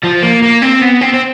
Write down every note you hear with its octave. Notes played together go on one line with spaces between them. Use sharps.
F3
A#3
A#3
C4
B3
C4
C4